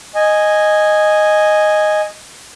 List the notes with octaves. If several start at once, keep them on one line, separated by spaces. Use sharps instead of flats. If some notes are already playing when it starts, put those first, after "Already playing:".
D#5 G#5